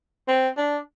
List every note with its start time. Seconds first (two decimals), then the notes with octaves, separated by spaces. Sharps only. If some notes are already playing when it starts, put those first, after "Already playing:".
0.28 C4
0.57 D4